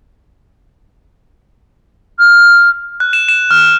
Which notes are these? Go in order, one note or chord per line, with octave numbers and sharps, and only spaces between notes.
F6
F#6
E7
E7
F6